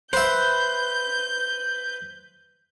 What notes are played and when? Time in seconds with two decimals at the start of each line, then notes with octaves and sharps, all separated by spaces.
0.13 B4 C5 E5 G6